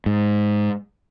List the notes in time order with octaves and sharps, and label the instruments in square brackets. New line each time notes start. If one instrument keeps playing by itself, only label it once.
[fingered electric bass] G#2